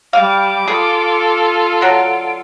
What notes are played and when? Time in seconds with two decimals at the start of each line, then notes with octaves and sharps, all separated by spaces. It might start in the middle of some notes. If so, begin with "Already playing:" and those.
0.13 G3 F5 D6
0.68 F4 G#4 A4
1.81 D3 F#3 D7